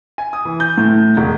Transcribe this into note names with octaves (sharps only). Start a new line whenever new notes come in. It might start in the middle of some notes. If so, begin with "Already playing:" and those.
G#5
D#6
E3
G6
A2
E1